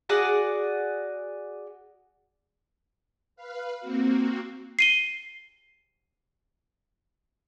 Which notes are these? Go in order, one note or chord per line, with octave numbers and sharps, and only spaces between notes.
F#4 G#4 D5 F#5
B4 F5
A#3 C4 F#4
C7 D#7 G7